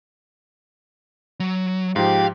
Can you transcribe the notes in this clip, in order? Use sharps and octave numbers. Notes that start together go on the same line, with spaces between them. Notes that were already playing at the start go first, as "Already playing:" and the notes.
F#3
G#2 F3 G4 F5